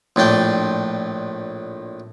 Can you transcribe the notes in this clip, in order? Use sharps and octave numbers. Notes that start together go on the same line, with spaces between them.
A#1 A2 D4 G5